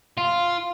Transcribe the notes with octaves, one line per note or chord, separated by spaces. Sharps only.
F4